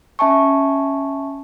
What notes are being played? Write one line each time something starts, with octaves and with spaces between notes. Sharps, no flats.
C#4 E5 G#5 A5 C#6